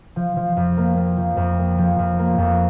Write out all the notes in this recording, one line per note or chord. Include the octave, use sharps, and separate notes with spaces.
F3
F3
F2
A#3
A#3
F3
F2
A#3
F3
F2
A#3
F2